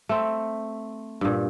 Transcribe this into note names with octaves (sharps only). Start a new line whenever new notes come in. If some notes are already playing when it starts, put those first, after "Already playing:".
A3 C4
G2 A#2